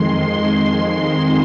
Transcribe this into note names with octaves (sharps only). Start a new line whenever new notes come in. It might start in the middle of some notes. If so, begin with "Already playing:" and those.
Already playing: F2 D#3 G#3 C6